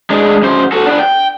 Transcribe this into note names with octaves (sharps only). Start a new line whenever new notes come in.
G#3 D4
F#2 C5
F#4 A4
B3 D4
G5